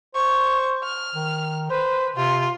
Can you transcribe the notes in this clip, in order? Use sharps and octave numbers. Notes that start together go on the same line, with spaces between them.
C5 C#6
F6
D#3
B4 C5
C3 F4